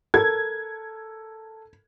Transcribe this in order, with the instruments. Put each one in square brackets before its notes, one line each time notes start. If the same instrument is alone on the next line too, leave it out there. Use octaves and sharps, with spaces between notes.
[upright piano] A4 A#4 [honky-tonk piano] G#6